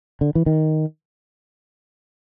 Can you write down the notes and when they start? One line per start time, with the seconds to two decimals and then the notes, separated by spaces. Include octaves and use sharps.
0.21 D3
0.35 E3
0.46 D#3